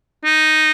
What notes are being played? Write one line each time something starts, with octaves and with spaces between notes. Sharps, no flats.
D#4